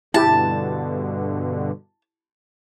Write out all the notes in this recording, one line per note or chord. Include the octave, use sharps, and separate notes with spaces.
G2 B2 D3 E4 G4 A5